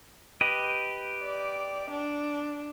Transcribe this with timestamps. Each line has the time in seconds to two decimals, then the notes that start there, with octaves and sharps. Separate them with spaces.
0.41 G4 B4 D#5
1.23 D5
1.91 D4